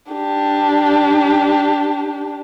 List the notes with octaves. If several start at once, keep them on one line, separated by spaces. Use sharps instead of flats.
D4 G4